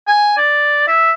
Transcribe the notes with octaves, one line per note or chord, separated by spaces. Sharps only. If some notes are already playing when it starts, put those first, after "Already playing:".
G#5
D5
E5